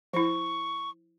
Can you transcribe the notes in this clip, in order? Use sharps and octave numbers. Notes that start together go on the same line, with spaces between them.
F3 E4 C#6